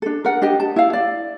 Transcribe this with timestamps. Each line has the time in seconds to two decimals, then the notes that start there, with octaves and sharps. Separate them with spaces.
0.02 D4 A4
0.25 A#4 F#5
0.42 D4 G4 D#5 G5
0.60 A5
0.76 E4 F5
0.93 D5